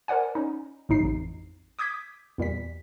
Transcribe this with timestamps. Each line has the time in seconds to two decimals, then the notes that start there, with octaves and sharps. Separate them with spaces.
0.08 A#4 C5 D5 F#5 G#5
0.35 C#4 D#4
0.89 G1 A2 D#4 C7
1.01 A1 F2
1.79 D6 D#6 G6 G#6 B6
2.38 E2 A#2 G3 B6